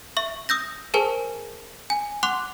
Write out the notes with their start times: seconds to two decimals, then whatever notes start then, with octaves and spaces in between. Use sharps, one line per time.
0.17 E5 C#6
0.49 D#6 E6 G6 A#6
0.94 G#4 A#4 C5 G#5 A5
1.90 G#5
2.23 F#5 C6 D6 F#6 F7